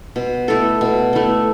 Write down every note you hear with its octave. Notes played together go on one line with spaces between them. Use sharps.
B2
A3 E4 A4
B2
A3 E4 A4